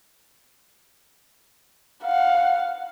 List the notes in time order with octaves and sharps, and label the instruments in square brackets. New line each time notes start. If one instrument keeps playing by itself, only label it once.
[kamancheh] F5 F#5